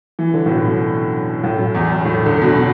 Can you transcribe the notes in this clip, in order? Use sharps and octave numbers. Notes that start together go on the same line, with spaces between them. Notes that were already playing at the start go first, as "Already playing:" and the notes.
E3
D3
A2
B2
F#2
A2
F#2
E2
F#2
A2
D3
B2
D3